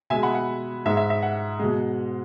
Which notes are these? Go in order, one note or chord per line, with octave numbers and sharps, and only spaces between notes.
B2 G#3 E5 G#5
F#5 B5
F#5
G#2 G#3 E5
E5
E5
F#5
B2 G#3